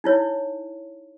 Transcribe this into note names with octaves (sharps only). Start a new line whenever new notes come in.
D#4 E4 C#5